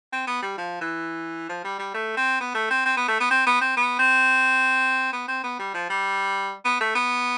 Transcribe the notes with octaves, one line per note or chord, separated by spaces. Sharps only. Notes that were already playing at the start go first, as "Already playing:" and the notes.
C4
B3
G3
F3
E3
F3
G3
G3
A3
C4
B3
A3
C4
C4
B3
A3
B3
C4
B3
C4
B3
C4
B3
C4
B3
G3
F3
G3
B3
A3
B3